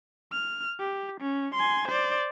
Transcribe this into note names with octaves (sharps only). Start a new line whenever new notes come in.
F6
G4
C#4
G#5 C6
C5 D5